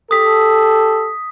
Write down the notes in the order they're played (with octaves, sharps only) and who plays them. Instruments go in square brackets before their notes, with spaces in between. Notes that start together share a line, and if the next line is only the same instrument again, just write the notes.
[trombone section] G4 A4 [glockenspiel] D#6 B6